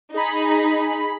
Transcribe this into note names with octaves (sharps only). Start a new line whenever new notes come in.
D#4 G#4 B5